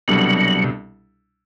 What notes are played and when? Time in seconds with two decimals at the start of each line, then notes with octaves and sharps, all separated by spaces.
0.08 C2 B2 F#3 G3 D4 A4
0.64 C3